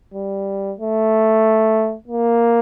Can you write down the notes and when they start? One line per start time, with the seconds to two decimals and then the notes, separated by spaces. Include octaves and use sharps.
0.14 G3
0.79 A3
2.08 A#3